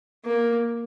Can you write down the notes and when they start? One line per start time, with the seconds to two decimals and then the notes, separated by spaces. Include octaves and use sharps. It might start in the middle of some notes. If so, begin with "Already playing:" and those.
0.25 A#3